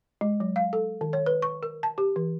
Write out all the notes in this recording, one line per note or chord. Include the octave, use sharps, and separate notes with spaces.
G#3
F#3
F5
A4
D#3
C#5
B4
C#6
A#4
A5
G4
E3